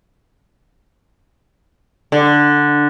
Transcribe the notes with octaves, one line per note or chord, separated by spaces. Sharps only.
D3